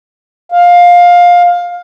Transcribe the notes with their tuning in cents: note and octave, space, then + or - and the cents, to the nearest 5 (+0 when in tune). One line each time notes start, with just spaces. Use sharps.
F5 +15